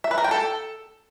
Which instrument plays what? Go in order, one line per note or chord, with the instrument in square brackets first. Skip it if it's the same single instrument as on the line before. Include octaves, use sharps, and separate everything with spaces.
[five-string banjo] E5
B4
A#4
G5
A4